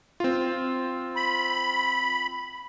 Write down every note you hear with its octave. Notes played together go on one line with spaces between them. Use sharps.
C4 F4
B5